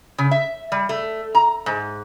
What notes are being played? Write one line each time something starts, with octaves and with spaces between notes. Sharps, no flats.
C#3
E5
G3
A3
A#5
G#2